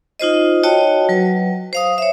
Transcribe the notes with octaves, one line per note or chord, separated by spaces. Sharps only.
D#4 F4 C5 D#5
F#4 C#5 D#5 G5 A5
F#3 B4
C5 F5 D#6
C#5 E5